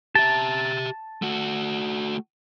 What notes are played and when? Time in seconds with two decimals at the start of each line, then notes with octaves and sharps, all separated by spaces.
0.15 G4 E5 A5
1.22 A3 F#4